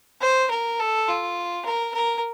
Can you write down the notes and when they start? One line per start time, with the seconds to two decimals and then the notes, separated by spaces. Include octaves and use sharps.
0.21 C5
0.51 A#4
0.80 A4
1.08 F4
1.66 A#4
1.94 A#4